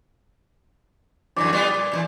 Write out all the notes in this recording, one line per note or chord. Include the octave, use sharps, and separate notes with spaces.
F2 D3 E3 D5
G3 B3 F4
A#2
A#2 C#3 E3